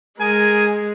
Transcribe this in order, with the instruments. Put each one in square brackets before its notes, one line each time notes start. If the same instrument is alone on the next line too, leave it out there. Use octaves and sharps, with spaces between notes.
[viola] G#3 [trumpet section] G#4 A#4 G#5